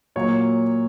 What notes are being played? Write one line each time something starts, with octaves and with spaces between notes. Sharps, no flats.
A#2 F#3 A#3 C#5